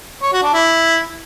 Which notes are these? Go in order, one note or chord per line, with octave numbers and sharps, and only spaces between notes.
C#5
F#4
D4
E4